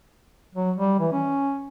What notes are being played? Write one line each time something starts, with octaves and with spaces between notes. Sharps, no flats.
F#3
G3
E3
C#4